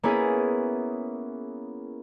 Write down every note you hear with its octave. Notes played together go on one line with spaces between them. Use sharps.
A#3 B3 C#4 E4 G#4